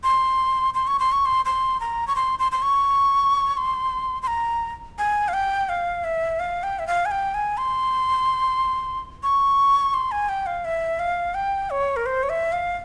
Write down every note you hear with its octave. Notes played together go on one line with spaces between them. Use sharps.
C6
C6
C#6
C6
C#6
C6
C6
A#5
C#6
C6
C6
C6
C#6
C6
C6
A#5
G#5
F5
G5
F5
E5
F5
G5
E5
F5
G#5
G5
G#5
C6
C#6
C6
G#5
G5
F5
E5
F5
G5
C#5
A#4
C5
C#5
E5
F5